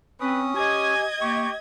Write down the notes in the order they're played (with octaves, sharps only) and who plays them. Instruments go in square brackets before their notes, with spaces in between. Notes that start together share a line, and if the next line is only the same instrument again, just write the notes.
[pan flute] C4 [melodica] C#4 D#6 [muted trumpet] B4
[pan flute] G4 [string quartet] D#5 G#6 [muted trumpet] G#5
[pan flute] A#3 [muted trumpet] G4 [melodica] C#6